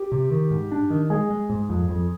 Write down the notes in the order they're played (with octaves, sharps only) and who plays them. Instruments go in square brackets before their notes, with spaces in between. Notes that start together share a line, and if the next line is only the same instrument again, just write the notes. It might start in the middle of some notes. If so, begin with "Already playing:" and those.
Already playing: [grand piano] G4
[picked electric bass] C3
D#3
G#2
D4
D#3
[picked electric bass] G#3 [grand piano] G#4
[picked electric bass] G#3
G#2
F2
F2